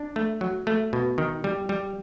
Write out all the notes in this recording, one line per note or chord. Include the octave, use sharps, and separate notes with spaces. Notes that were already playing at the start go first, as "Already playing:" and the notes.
Already playing: D4
A3
F#3
A3
B2
D#3
G3
G3